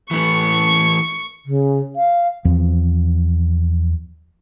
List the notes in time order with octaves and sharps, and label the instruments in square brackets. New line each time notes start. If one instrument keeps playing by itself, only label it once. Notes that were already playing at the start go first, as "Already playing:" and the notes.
[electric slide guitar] E3 A3 B4 [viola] C#6
[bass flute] C#3
F5
[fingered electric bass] E2 F3 C4